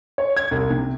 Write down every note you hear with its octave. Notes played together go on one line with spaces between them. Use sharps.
C#5
G#6
C2
C3